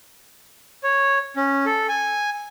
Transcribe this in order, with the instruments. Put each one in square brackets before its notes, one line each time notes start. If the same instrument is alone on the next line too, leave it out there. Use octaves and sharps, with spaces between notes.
[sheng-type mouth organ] C#5
C#4
A4
G#5